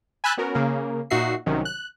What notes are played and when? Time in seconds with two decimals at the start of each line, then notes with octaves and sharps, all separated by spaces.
0.24 G#5 B5 E6 F#6 G6 A6
0.37 B3 C#4 F#4 A#4
0.55 C#3 A#3 A#4
1.10 A#2 D#4 F#4 E5 C7
1.46 C2 C3 D#3 F#3 C#4
1.65 F#6